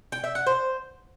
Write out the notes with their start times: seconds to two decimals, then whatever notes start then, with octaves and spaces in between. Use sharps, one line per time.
0.12 G5
0.24 E5
0.35 F#5
0.47 C5